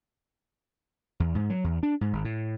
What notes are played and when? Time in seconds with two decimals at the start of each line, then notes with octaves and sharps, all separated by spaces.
1.20 E2
1.35 G#2
1.50 F#3
1.64 E2
1.83 D4
2.01 G#2
2.13 G#1
2.25 A2